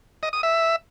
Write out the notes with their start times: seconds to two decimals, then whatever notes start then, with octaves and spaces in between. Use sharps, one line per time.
0.23 D#5
0.33 D#6
0.43 E5